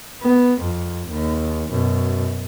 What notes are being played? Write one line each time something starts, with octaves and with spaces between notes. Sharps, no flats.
B3
F2
D#2
F#2 B2